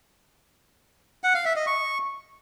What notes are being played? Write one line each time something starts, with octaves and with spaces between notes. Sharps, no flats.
F#5
F5
E5
D#5
C#6